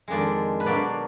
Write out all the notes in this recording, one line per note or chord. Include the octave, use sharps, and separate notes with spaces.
F2 D#3 G#3 D4 D5
B4
B2 F#3 A#3 D4 D5